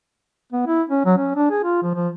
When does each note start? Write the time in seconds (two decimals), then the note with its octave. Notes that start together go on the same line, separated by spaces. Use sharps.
0.53 B3
0.67 E4
0.90 C#4
1.05 F#3
1.17 C#4
1.36 D4
1.50 G#4
1.64 F4
1.83 F3
1.95 F3